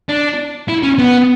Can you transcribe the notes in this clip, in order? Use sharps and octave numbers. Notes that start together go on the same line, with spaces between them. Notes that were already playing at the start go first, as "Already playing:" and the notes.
D4
E4
C#4
B3